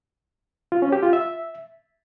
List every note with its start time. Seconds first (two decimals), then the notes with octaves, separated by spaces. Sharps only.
0.72 F4
0.82 C#4
0.92 G4
1.03 F4
1.13 E5